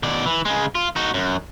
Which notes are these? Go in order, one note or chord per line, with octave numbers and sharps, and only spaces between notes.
B2 D5
E3
C#3 G#3
F4
D#4 F#4
F#2